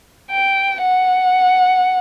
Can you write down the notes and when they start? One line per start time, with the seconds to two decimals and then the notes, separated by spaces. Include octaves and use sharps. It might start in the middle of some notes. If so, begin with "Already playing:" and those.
0.31 G5
0.82 F#5